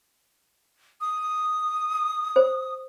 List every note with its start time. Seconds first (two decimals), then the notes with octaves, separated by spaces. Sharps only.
1.01 D#6
2.36 C5